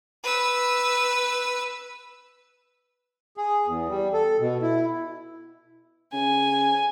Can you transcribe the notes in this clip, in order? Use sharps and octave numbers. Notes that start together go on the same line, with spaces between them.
B4 E6
G#4
E2
G3
A4
B2
E4
C#3 G#5